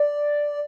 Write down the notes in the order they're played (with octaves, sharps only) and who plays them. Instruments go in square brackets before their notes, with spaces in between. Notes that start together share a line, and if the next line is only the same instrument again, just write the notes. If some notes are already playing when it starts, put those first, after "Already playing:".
Already playing: [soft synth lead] D5